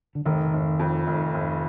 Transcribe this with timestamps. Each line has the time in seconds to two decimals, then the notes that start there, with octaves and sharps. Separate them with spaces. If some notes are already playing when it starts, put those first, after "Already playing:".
0.15 D3
0.26 F1 D#3
0.53 F1
0.79 F2
1.07 F1
1.34 F1